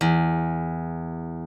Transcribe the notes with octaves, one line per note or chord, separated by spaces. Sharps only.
E2